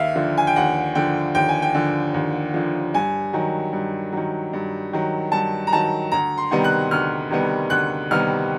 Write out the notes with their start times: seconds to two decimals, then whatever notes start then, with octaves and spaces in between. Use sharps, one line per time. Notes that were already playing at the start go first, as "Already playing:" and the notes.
Already playing: D#2 E5 F5
0.15 D3 F3
0.38 G#5
0.47 G5
0.56 D#2 F#5
0.95 D3 F3 G5
1.34 D#2 G5
1.49 G#5
1.62 G5
1.75 D3 F3
2.14 D#2
2.54 D3 F3
2.94 G2 G#5
3.33 D#3 F#3
3.73 G2
4.13 D#3 F#3
4.53 G2
4.93 D#3 F#3
5.32 G2 A5
5.67 A#5
5.73 D#3 F#3 A5
6.12 D2 A#5
6.38 C6
6.51 C3 D#3 G3 B3
6.64 F#6
6.91 D2 F6
7.31 C3 D#3 G3 B3
7.70 D2 F#6
8.11 C3 D#3 G3 B3 F6